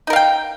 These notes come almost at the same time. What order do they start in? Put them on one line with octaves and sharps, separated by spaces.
D#4 A#4 F5 G5